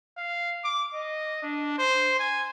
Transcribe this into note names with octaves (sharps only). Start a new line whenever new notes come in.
F5
D6
D#5
D4
C5
G#5